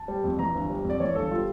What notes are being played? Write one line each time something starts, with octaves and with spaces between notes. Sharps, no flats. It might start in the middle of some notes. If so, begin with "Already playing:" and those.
Already playing: A5
G3
F2
E3 A#5
G1
G3
F2 D5
E3 C#5
G1 A4
G3 F4